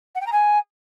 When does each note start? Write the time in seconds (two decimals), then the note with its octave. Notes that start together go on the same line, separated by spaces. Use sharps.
0.15 F#5
0.21 G5
0.27 A#5
0.32 G#5